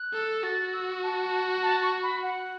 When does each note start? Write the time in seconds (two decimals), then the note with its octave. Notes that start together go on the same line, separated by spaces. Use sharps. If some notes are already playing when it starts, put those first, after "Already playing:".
Already playing: F#6
0.14 A4
0.44 F#4 A6
0.73 E6
1.03 A5
1.63 A5
1.82 C#6
2.03 B5
2.23 F#5